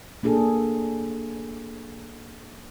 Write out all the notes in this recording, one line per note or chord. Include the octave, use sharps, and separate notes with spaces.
A#3 D4 G#4 A4